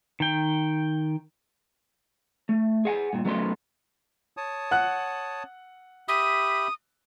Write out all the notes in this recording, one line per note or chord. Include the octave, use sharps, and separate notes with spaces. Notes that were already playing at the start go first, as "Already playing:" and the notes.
D#3 G5
A3
G#4 F#5 G#5
G2 A#2
F#3 A3 B3 C#4 C6
C#5 A5 D#6
F#5 F#6
G4 E5 B5 D#6